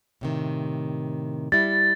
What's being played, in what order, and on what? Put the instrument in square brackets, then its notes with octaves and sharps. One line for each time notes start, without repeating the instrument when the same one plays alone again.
[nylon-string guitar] A2 C3 D#3
[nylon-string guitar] G3 E4 [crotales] A6